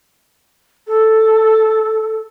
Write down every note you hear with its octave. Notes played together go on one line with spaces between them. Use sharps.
A4